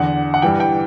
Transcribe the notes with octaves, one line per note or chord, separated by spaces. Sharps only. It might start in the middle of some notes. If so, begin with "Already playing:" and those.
Already playing: E2 D3 F#5
F#5
G2 E3 G5
G5